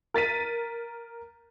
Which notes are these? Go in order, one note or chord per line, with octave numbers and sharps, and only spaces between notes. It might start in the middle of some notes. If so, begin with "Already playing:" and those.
A#4 A6 B6 D#7